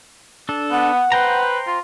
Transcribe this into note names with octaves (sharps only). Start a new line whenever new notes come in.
D4 A4
B3 F#5
B4 C5 G5 A#5
F4